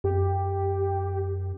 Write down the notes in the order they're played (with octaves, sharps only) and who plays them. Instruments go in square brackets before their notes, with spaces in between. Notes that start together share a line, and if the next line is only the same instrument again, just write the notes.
[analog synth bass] F#2 [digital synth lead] G4